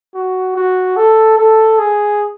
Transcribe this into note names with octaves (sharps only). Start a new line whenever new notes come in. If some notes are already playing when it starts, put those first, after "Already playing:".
F#4
F#4
A4
A4
G#4